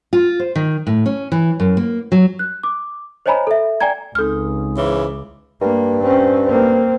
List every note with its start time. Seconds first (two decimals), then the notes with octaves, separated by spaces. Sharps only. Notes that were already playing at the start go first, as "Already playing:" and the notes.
0.13 F4
0.39 C5
0.56 D#3
0.87 A2
1.06 C#4
1.32 E3
1.60 F#2
1.77 A#3
2.12 F#3
2.39 F#6
2.63 D6
3.26 C5 C#5 D#5 G#5 A#5 B5
3.47 A4 E5
3.81 D5 G5 G#5 A#5 G#6
4.15 C#2 G#3 C4 D#4 A4 F6
4.77 G#2 C#3 E3 D6
5.62 G2 A#3
6.03 C4 C#4
6.45 A#3 C4